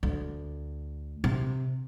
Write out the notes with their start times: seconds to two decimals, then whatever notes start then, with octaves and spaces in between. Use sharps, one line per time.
0.03 D2
1.24 C3